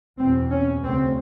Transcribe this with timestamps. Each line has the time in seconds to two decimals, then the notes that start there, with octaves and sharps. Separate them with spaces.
0.19 E2 B2 C4
0.50 C#4
0.82 D2 C#3 C4